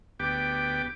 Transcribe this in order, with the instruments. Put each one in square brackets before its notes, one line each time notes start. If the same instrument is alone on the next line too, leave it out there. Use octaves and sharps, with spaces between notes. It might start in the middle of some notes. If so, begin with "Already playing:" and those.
[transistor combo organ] D2 B3 G4 G5 D6